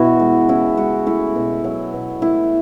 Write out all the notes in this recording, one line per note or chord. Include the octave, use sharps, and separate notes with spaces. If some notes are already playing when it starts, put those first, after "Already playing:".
Already playing: B2 E3 E4 F#4
G#3
C#3 E4
G#3 F#4
A3 E4
B2
F#3
B2
A3 E4